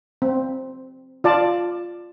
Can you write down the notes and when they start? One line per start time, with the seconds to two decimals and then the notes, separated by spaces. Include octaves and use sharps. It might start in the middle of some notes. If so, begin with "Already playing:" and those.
0.22 C4
1.24 F4 D5 A5